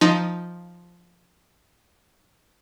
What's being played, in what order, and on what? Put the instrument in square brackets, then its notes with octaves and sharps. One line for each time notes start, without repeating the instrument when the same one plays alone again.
[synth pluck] F3 D#4